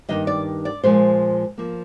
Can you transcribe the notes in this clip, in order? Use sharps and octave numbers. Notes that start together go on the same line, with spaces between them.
G2 D#3 A#3 D#5
D5
D5
A#2 F3 G#3 C5
F3 A#3